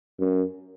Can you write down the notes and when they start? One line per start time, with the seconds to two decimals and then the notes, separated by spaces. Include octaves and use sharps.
0.20 F#2